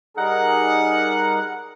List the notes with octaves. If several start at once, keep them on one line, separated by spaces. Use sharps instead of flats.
G3 D#4 G#4 A#4 F#5